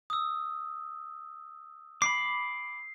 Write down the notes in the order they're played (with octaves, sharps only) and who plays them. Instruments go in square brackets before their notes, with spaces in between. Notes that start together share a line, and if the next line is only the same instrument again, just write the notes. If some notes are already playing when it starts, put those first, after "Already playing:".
[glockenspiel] D#6 E6
[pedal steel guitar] B5 D6 [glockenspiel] C7